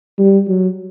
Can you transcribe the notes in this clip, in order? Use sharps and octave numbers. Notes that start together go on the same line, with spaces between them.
G3
F#3